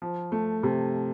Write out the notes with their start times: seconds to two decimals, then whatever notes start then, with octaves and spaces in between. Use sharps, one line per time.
0.02 F3
0.32 A3
0.63 C3